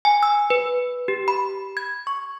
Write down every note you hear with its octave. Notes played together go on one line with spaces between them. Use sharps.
G#5
E6
B4
G4
B5
G#6
C#6